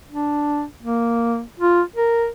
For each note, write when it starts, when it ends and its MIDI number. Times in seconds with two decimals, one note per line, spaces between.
0.11 0.64 62
0.81 1.42 58
1.60 1.82 65
1.96 2.28 70